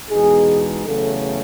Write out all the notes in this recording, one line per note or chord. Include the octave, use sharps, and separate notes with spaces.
E2 B2 G#3 D#4 G#4
E2 C#3 F#3 A3 A4